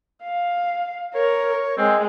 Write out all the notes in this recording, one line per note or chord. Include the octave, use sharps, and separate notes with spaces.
F5
A#4 C#5
G#3 C4